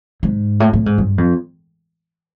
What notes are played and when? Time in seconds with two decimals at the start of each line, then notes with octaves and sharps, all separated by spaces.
0.23 G#2
0.60 A2
0.73 A2
0.86 G#2
0.98 G2
1.18 F2